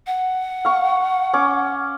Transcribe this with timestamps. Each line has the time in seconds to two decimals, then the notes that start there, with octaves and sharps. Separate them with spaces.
0.07 F#5
0.65 F5 C#6
1.33 C#4 D6